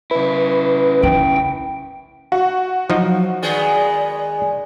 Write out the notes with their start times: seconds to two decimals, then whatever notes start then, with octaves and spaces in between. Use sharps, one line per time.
0.11 C#3 E4 B4
1.03 D#4 G5
2.32 F#4
2.90 F3 F#3 D#4
3.42 D#3 G#3 B3 D5